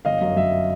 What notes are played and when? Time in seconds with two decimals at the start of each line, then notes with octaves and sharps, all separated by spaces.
0.05 G1 D#5 F5
0.21 F#2
0.36 F#2 E5